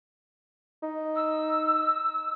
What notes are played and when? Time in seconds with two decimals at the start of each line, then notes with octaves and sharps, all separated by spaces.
0.83 D#4
1.15 E6